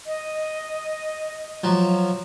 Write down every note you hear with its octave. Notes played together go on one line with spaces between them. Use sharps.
D#5
F3 F#3